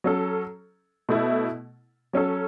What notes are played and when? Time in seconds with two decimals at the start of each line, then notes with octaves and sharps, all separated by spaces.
0.04 F#3 C#4 A4
1.09 B2 A3 E4
2.13 F#3 C#4 A4